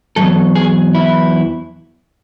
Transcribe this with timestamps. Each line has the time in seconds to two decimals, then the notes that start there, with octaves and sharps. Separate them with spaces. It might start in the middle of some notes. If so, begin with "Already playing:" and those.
0.16 E2 B2 F#3 A4
0.55 G#4
0.94 E4